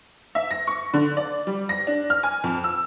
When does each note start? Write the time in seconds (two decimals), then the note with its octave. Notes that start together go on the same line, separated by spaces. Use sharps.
0.35 E5
0.51 A#6
0.67 C#6
0.93 D3
1.17 D5
1.47 G3
1.69 A#6
1.87 D4
2.10 F6
2.23 G#5
2.44 F2
2.64 E6